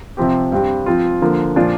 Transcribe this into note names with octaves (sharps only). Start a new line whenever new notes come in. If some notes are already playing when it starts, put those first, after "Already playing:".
C3 F3 C4 G4
G2 G3 C4 G4
F3 C4 F4
D3 F3 A#3
A#2 F3 D4 F4